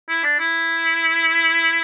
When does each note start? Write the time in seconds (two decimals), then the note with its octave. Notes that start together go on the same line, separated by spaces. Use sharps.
0.09 E4
0.24 D4
0.39 E4